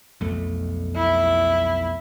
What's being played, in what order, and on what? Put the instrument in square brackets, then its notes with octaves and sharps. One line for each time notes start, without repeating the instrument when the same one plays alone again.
[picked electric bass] B1 F2 A3
[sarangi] E4